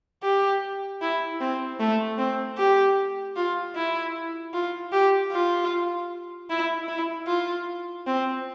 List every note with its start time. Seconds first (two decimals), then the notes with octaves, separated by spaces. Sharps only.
0.23 G4
1.02 E4
1.41 C4
1.80 A3
2.18 C4
2.57 G4
3.36 F4
3.75 E4
4.54 F4
4.92 G4
5.32 F4
6.49 E4
6.88 E4
7.27 F4
8.06 C4